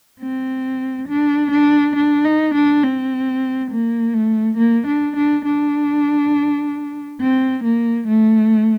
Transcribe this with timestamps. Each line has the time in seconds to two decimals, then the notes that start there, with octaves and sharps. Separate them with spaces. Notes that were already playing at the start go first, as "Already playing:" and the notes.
0.20 C4
1.08 D4
1.51 D4
1.96 D4
2.25 D#4
2.55 D4
2.83 C4
3.71 A#3
4.14 A3
4.57 A#3
4.87 D4
5.17 D4
5.45 D4
7.21 C4
7.64 A#3
8.08 A3